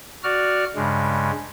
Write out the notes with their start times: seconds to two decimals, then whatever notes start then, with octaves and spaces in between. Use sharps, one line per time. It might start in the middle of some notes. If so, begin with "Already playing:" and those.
0.23 F#4 D5 F6
0.75 G2 C#3 G#3